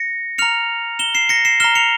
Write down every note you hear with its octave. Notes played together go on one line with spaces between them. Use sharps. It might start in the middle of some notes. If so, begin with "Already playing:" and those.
Already playing: A#6 C#7
A#5 F6 C#7 F7
E7 G7
C7 E7
A#6 C#7
C7 E7
A#5 F6 E7 G7
C#7 F7